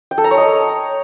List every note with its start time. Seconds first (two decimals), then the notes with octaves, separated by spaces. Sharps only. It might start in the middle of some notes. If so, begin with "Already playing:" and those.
0.11 G5
0.18 A4
0.24 A#5
0.31 C#5
0.37 D#5